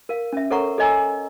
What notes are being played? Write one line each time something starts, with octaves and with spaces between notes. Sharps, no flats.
A#4 F5
C#4 E5
A4 A#4 C#5 F#5 A#5 C#6
A4 C#5 D#5 G#5 A#5 E6